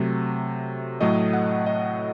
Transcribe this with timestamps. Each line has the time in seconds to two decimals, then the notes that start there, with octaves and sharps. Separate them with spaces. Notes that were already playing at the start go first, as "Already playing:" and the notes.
Already playing: C3 F#3 A3
1.01 A2 F#3 A3 D#5
1.33 F#5
1.66 D#5